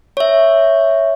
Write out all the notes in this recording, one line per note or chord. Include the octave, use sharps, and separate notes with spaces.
C#5 E5